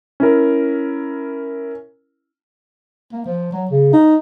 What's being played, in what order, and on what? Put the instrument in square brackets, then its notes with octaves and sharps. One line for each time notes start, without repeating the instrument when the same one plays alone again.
[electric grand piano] C#4 E4 A#4
[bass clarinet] A#3
F3
F#3
C#3
D#4